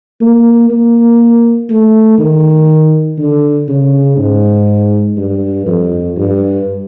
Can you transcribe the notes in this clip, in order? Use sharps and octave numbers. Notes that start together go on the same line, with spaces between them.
A#3
A#3
A3
D#3
D3
C#3
G#2
G2
F2
G2